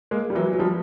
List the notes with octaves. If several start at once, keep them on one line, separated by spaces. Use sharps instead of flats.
G#3 A#3
G3
E3 F#3
F#3
F3 G3